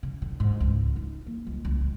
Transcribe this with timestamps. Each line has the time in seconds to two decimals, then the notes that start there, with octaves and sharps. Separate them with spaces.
0.03 C#3
0.22 D3
0.40 G#2
0.60 C#2
0.96 D#4
1.26 A#3
1.47 C#2
1.65 C#2
1.81 C#2